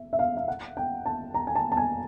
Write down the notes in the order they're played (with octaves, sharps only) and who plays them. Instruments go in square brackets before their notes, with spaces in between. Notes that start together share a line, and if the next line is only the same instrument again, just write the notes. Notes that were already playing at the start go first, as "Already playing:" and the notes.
Already playing: [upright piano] E5
E5
F5
F5
F#5
G5
A5
A#5
G#5
A5
A5
G#5